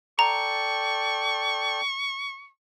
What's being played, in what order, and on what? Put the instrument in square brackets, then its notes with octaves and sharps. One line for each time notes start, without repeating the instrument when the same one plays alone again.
[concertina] A4 D5 G5 [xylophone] A#5 [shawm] C#6